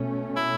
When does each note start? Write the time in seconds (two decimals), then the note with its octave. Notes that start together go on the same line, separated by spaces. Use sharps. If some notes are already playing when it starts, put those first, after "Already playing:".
Already playing: B2 A3 C#4
0.36 E4